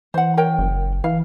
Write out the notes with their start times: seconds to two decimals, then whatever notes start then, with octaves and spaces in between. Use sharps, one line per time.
0.14 E3 C5 F#5
0.37 A#4 C#5 G5
0.58 F#1
1.04 E3 F5